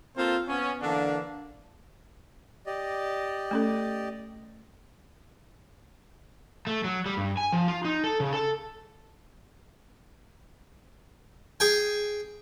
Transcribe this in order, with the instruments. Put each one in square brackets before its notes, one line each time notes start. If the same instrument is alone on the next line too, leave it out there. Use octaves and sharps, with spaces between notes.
[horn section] A#3 C4 F4 A4 C5
B3 C#4
D3 E3 A#3 D4
[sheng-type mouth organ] G4 D5 D#5
[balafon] A3 C#4 A4
[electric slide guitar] A3
F#3
G3
G2
G#5
F3
F4
D#4
A4
C#3
A4
[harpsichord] G#4 G5 G#5